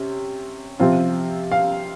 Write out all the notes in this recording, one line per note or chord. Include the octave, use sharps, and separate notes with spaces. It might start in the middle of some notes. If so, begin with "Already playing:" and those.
Already playing: C3 C#4
C3 F3 C4 F4
F5